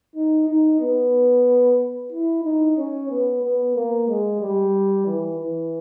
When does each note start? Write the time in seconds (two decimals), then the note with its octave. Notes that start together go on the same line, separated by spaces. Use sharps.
0.15 D#4
0.48 D#4
0.81 B3
2.12 E4
2.44 D#4
2.77 C#4
3.10 B3
3.43 B3
3.76 A#3
4.09 G#3
4.41 G3
5.06 E3
5.39 E3